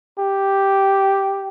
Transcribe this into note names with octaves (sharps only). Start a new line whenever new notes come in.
G4